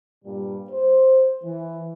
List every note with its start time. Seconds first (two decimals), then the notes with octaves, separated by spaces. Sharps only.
0.24 G2 A#2 G3
0.70 C5
1.44 E3